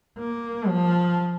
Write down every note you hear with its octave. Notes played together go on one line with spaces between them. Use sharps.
A#3
F3